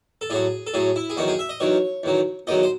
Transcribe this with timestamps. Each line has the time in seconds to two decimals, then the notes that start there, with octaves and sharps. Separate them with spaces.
0.21 A4
0.30 A2 F#3 G#4
0.67 A4
0.74 A2 F#3 G#4
0.96 E4
1.10 G#4
1.17 E2 D#3 F#3 F#4
1.28 G#4
1.39 E5
1.49 D#5
1.60 E2 D#3 F#3 C#5
2.03 E2 D#3 F#3
2.47 E2 D#3 F#3 D#5
2.63 C5